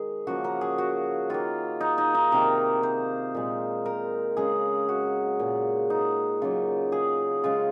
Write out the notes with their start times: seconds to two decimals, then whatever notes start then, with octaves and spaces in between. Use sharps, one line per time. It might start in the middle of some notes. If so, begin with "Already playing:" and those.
Already playing: D#3 G#3 G#4
0.27 C#3 F3 A#3 F#4
0.44 A#4
0.61 G#4
0.78 F#4
1.29 D#3 A#3 F4
1.81 D#4
1.98 D#4
2.15 D#4
2.32 C3 D#3 A#3 A#4
2.83 C5
3.35 A#2 G#3
3.86 A#4
4.37 C#3 G#3 G#4
4.89 F#4
5.40 A#2 G#3
5.90 D#4
6.42 C#3 F#3 A#3 F4
6.92 G#4
7.44 C#3 G#3 F4